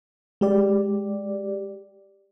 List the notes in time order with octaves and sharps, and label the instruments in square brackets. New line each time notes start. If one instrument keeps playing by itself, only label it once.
[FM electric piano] G#3 G4 D5